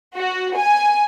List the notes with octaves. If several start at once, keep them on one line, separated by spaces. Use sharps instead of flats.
F#4
G#5